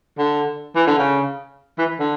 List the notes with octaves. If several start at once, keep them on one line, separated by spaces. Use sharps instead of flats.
D3
E3
D3
C#3
E3
D3